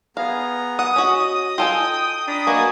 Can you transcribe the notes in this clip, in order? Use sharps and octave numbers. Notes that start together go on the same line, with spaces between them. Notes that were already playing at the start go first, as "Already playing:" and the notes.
B3 G#4 F5 A#5
F#5 D#6
C#4 F#4 D#5
F4 A4 G5 G#5
D4 A#5 B5
A#3 F#4 B4 D5 D#5 G#5